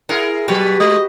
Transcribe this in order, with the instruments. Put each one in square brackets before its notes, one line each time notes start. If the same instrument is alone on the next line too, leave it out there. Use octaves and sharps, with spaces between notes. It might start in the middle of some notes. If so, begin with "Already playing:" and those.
[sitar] E4 G#4 A#4 [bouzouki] F#5
[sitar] B2 F#3 B4 [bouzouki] F#4 G4 F#5
[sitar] G#3 [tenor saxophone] D#5